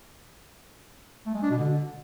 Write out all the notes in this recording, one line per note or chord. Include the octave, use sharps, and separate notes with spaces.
A3
G#3
D4
B2
D3